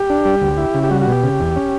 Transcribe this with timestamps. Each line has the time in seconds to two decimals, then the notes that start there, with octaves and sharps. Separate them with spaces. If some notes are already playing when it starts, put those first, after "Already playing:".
Already playing: G4
0.10 D4
0.25 G3
0.41 D2
0.57 E4
0.74 C#3
0.83 G4
0.91 G3 F#4
1.01 F#4
1.07 B2 G4
1.23 C#3
1.40 E2
1.56 C#4